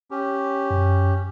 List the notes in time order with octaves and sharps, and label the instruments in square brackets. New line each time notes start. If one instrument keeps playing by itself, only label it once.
[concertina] C#4 G4
[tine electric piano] F#2